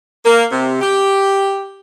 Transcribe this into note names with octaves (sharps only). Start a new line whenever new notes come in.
A#3
C3
G4